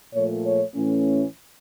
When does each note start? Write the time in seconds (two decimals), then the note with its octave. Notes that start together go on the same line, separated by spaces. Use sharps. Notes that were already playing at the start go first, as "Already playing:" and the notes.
0.14 A#2 F3 A3 C#5
0.45 C#5
0.75 A2 E3 A3 C#4